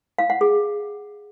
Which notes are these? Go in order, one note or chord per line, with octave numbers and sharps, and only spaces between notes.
F5
F#5
G#4